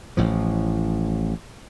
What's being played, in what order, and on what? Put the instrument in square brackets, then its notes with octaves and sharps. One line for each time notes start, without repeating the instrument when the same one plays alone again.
[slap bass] A1 A2 F3